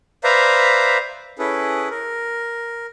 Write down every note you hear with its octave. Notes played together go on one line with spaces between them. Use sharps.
B4 C5 D5 E5 F5 A#5
C#4 E4 G#4 A4 B4
A#4